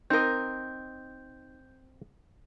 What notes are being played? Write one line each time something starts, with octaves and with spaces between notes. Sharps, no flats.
C4 D#4 A#4 D#5 G6